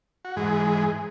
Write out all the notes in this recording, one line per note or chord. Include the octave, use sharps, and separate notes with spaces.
F#4
G#2 E3 G#3 G#4